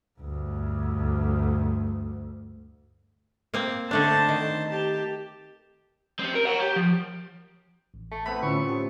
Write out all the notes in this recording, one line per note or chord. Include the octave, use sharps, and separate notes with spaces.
D2 G2
A#3 C4
D3 A3 D4 C5 A5
D#3
G4 A5
C4 G4
A#4
F#5 A#5
G4
F3
A1
A3
A3 B3 C4 B5
A2 D3 C#4 F4 C#6
G4